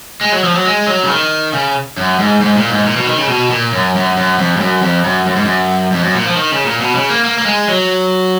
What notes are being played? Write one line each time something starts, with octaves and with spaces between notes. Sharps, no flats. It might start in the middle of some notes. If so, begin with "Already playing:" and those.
G#3
F#3
F3
F#3
G#3
F#3
C#3
D#3
C#3
F#2
G#2
G#2
A#2
G#2
A#2
B2
D#3
C#3
B2
A#2
F#2
F#2
F#2
F2
G#2
F#2
F2
F#2
F#2
G#2
F#2
F2
F#2
A#2
F3
D#3
C#3
A#2
B2
C#3
A#3
A#3
A#3
G#3
F#3